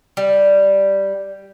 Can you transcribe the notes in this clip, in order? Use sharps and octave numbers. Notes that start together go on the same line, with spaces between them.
G3